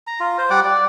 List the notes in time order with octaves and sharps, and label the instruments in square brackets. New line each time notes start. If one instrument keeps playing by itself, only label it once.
[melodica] A#5
F4
C5
G3 D5 F#5 D6
D5